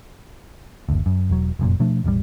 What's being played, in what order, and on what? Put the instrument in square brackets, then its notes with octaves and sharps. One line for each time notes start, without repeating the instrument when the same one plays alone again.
[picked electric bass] F#1 D2
F#2
E1 F#3
F1 F#2 A#2
B2 F3 A3 D4
E1 A1 D2 G3